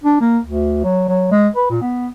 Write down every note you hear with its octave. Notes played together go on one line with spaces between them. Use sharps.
D4
A#3
D2
F#3
F#3
G#3
B4
A#2
B3